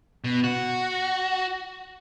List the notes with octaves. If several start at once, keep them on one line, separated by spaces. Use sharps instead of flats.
B2
F#4